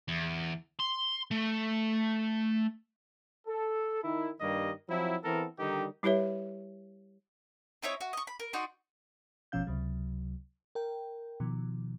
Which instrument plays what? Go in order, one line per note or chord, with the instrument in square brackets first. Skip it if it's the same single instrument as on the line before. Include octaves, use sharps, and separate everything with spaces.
[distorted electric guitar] E2
C6
A3
[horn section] A4
D#3 E4
G2 D#3 G3 A#3 D#5
F3 F#3 C4 E4
E3 B3 C4 A4 A#4
D3 D#3 G3 D#4 G4
[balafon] G3 E4 G4 B4 C#5 E5
[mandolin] C4 D#4 E4 C#5
F#4
D#5 C#6
B5
A#4
D#4 F#4 D5 C6
[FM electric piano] G1 B2 F3 C#4 F5 G6
C#2 C3 F#3
A#4 G5
B2 D#3 F3